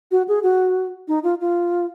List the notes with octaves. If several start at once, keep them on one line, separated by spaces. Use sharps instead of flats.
F#4
G#4
F#4
D#4
F4
F4